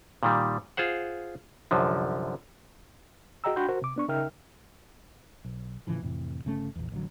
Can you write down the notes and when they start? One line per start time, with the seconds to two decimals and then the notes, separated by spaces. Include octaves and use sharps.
0.23 A#2 D#3 G3
0.77 F4 G#4 C5 F#5
1.71 C2 F#2 D3 F3
3.44 F#4 G#4 D#5 G5 A#5 E6
3.56 D4 F#4 G5 B5 C6 G6
3.69 F#4 A#4 C5
3.82 C3 D6
3.96 B3 D4 C#6
4.08 C#3 D#4 A#4 E5 G5 F6
5.45 B1
5.87 A2 C#3 E3 F3
6.02 F2 A2 C3 E3
6.45 G1 C#3 A3 C#4
6.75 A#1 E2
6.92 A1 D3 F#3